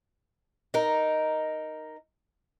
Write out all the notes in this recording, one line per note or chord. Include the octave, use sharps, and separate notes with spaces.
D#4 A#4